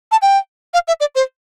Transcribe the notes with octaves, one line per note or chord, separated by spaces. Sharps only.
A5
G5
F5
E5
D5
C5